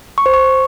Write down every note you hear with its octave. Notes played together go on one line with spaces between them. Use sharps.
C#6
C5
C#6